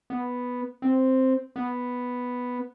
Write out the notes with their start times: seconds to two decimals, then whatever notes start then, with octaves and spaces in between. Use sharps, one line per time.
0.10 B3
0.82 C4
1.56 B3